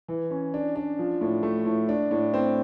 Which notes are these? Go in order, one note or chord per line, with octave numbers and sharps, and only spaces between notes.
E3
C#4
D4
D4
F3
A2
A3
A2
D4
A2
C4